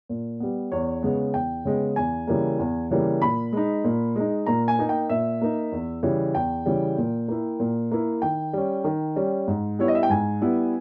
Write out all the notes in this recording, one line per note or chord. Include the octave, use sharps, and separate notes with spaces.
A#2
G3 B3
E2 C#5
C#3 G#3 B3
E2 G5
C#3 G#3 B3
E2 G#5
C#3 E3 G3 A#3
E2
C#3 E3 G3 A#3
A#2 B5
G#3 D#4
A#2
G#3 D#4
A#2 A#5
G#5
A#3 D#4
G5
A#2 E5
A#3 D#4
E2
C#3 E3 G3
E2 G5
C#3 E3 G3
A#2
A#3 E4
A#2
A#3 E4
D#3 G5
G3 C#4
D#3
G3 C#4
G#2
G3 B3 E4 C#5
D#5
E5
G5
G#2 G#5
G3 B3 E4